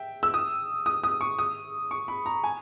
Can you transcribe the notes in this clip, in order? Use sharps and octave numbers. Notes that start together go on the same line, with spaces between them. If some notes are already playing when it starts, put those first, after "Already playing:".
Already playing: E5 G5
E6
D#6
D#6
D#6
C#6
D#6
C#6
B5
A#5
G#5